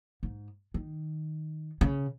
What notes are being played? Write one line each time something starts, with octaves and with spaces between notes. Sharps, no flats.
G#2
D#3
C#3